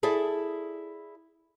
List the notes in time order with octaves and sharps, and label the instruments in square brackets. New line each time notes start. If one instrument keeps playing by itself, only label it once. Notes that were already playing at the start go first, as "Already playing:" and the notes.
[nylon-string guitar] E4 G#4 A4 D5 E5